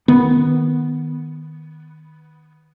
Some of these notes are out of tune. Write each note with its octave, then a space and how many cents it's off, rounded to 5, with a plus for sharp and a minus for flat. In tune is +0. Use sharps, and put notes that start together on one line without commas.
D#3 +0 B3 +0